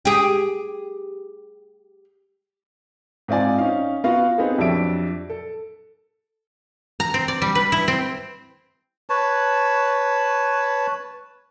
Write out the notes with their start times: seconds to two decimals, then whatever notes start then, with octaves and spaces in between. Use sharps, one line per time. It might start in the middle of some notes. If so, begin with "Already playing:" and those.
0.05 G4 G#4
3.28 G#2 C4 F4 D5 G#5
3.58 C#4 D#4 F5
4.04 B3 F4 F#4 F5
4.38 B3 C4 D#4 G#4 A4
4.58 F2 F#3 D4 G4 E5 D7
5.30 A4
7.00 A#5
7.14 C4
7.28 D5
7.42 G3
7.55 B4
7.72 E4
7.88 C4
9.10 B4 C#5 A5